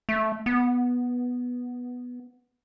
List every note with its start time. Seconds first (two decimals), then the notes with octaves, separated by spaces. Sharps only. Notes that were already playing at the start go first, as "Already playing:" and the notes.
0.09 A3
0.46 B3